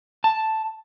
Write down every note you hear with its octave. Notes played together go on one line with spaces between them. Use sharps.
A5